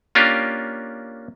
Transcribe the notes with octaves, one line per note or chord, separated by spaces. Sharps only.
A#3 C#4 D4 F4 G4 A#4